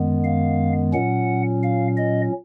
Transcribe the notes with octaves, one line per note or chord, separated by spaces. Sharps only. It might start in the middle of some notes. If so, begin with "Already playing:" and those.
Already playing: F#2 D#3 G#3 B3
F5
A#2 F#3 C#4 F#5
F5
D#5